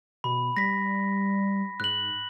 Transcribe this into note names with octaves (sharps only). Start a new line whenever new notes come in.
B2 B5
G3 A#6 B6
G#2 F#6 F#7